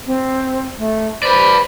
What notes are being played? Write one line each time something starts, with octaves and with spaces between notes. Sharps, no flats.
C4
A3
B4 C5 D5